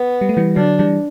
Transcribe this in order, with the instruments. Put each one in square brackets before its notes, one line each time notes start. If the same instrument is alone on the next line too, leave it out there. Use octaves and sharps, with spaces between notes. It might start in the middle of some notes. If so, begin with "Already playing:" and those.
Already playing: [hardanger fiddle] B3
[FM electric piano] G3
A3
E3 G3
[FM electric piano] D3 F#3 [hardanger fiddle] D4
[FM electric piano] E3 G3